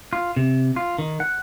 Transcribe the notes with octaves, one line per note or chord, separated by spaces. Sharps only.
F4
C3
F4
D#3
F#5